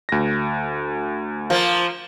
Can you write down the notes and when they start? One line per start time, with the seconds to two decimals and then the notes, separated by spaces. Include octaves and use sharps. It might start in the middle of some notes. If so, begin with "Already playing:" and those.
0.09 D2 A#6
1.50 F3 A#3